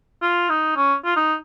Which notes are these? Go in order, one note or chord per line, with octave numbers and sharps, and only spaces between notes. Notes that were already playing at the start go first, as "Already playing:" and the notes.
F4
D#4
C#4
F4
D#4